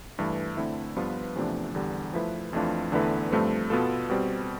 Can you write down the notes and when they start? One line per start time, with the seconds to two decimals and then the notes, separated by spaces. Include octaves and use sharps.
0.19 G2 E3 A3
0.57 D3 A3 C4 E4
0.96 G2 F3 B3 F4 B4
1.36 E2 C3 F3 A3 D4
1.75 E2 D3 G3
2.13 F3 A3 E4 B4
2.53 F2 E3 A3 D4 F4
2.92 E2 D3 A3 E4 B4
3.32 G2 F3 A3 C4
3.70 B2 B3 F4 A4
4.10 B2 G3 C4